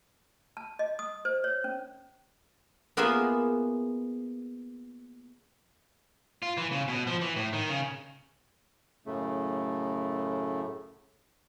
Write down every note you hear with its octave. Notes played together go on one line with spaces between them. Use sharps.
A5
D#5
D#6
C5
C#5
C#4
A#3 B3 F4 G#4 E5
F4
E3
C#3
B2
F3
E3
A2
D#3
C#3
F#2 A2 C#3 A3